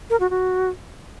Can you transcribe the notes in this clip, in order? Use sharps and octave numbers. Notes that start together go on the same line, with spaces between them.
A#4
F#4
F#4